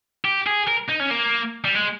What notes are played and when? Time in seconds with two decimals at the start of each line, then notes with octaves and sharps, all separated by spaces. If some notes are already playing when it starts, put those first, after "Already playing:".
0.25 G4
0.47 G#4
0.68 A#4
0.89 D#4
1.00 C#4
1.11 A#3
1.65 G3
1.75 G#3